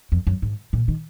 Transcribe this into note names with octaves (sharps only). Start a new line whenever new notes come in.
F2
F#2
G#2
A#2
D#3